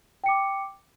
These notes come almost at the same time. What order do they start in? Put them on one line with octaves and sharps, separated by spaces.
G5 C#7 D6